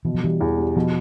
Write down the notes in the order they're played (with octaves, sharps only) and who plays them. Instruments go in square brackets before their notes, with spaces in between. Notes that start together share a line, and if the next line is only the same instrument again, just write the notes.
[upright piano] B2 [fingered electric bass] E3
[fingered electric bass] F3
[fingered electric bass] E3 [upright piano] G3
[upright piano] E2
G3
[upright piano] B2 [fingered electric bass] F3